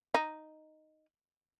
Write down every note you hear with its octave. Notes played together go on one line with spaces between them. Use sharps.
D#4